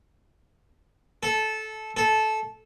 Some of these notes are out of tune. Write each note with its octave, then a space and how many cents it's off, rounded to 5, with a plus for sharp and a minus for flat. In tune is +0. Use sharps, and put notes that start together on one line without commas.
A4 -15
A4 -15